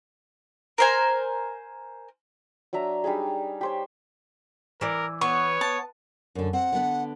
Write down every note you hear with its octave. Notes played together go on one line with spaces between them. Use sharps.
A#4 C5 G#5
F#3 D4 E5 A#5
G3 D4 D#4 G#4
G4 C5 C#5
E3 A#4 D5
B3 C#5 C#6
A5
F#2 D3
C4 F#5
D3 B3